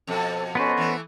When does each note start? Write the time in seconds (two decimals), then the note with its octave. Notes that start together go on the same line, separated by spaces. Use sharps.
0.07 F2 B2 A4 E6
0.55 B3 C#4 A4 B4 C5 D#5
0.77 E3 A3